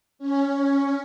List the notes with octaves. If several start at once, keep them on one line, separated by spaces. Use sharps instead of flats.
C#4